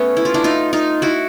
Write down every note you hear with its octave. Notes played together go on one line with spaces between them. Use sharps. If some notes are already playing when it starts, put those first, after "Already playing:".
Already playing: A3 B3 C#4
E4
F4
D4 E4
D#4 F4
D#4 F4
E4 F#4